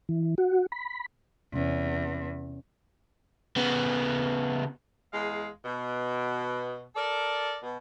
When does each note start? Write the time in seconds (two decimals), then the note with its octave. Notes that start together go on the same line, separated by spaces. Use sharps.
0.09 E3
0.38 F#4
0.72 B5
1.53 E2 C3 C#4
3.57 C#3 B3
5.13 E2 G#3 F5
5.65 B2
6.96 A4 A#4 D5
7.63 B2